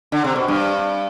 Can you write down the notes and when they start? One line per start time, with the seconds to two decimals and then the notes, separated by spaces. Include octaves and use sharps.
0.12 D3
0.24 C3
0.36 B2
0.48 G2